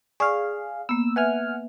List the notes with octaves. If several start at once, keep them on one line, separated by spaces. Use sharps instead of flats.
G#4 D5 F5 C#6
A#3 B3 E6
B4 E5 F#5 G#5 F6